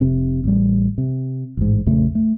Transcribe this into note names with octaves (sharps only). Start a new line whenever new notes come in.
F1 C3 C4
A1 G3
C3
A1 G#2
A#1 F2 C#3 A3
A3